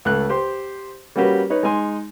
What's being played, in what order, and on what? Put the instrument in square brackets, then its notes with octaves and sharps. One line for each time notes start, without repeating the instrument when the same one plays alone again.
[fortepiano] C#2 A3 F#6
G4 C5 C6
G3 A#3 C#4 F#4 G4 B4
D#4 B4 C#5
G#3 D#4 G#5 C6